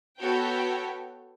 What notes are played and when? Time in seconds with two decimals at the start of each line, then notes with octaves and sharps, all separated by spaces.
0.18 B3 F#4 A4 C#5 G5